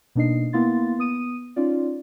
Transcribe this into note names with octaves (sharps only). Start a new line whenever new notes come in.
B2 A#3 D4 D#4 D#5 C7
A#3 B3 E4 F5 C6 A6
B3 D#6 D#7
C#4 D#4 F4 D5